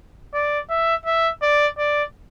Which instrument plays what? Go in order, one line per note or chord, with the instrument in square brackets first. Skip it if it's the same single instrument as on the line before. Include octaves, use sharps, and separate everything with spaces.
[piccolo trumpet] D5
E5
E5
D5
D5